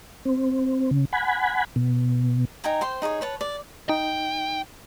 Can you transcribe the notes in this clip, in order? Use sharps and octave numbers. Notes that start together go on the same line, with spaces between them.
C4
C#3
F#5 G#5 B5
B2
D#4 G5 G#5 A#5
C5 G5 C6
D#4 G#4 B4 C#5
B4 C#5 A5
D5
D#4 G5